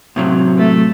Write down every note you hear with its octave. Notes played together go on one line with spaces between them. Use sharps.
A2 C3 F#3
A3